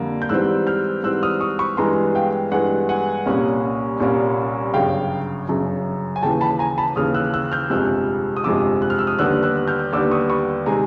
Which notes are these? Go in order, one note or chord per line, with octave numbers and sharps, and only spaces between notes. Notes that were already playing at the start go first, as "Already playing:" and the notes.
Already playing: F2 D3 G3 A#3
G6
G#2 E3 G3 C4 E6 F#6
F6 G6
G#2 E3 G3 C4 E6 F#6
D#6 F6
C#6 D#6
B5 C#6
G2 E3 G#3 B3 A#5 C6
F5 G5
G2 E3 G#3 B3 F#5 G#5
F#5 G#5
C2 A#2 G3 A#3 C#4
C2 A#2 G3 A#3 C#4
G1 F#2 C#3 F5 G5
G1 F#2 C#3
G#5
D#2 C#3 E3 G5 A5
A5 B5
G#5 A#5
A5 B5
D#2 C#3 E3 D#6 F6
E6 F#6
E6 F#6
F6 G6
G1 F2 C3 F3 G#3 E6 F#6
D#6
G1 F2 C3 F3 G#3 D6 E6
F#6
F6
E6
D#6 F6
D#2 D3 G3 B3 E6 F#6
E6 F#6
F6 G6
D#2 D3 G3 B3 D6 E6
C#6 D#6
B5 C#6
C3 D#3 G#3 G#5 A#5